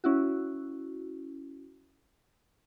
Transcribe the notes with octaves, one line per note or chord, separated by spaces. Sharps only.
C#4 E4 F#4